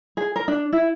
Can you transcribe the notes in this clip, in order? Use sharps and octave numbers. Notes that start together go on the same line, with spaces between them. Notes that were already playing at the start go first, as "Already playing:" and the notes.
G#4
A#4
D4
E4